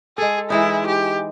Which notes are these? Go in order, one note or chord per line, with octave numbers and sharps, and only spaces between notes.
G#3 G#4 A4
E3 G#3 D#4 E4
G4